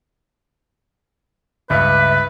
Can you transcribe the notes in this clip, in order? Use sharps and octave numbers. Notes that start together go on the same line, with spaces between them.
C#2 G2 B4 E5